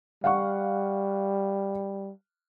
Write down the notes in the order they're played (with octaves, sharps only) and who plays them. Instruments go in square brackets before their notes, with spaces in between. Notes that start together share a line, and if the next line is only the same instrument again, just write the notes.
[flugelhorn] G3 [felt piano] F5 F#5 C#6